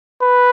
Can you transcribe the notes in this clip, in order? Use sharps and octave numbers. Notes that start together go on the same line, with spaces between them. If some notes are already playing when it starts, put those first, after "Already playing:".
B4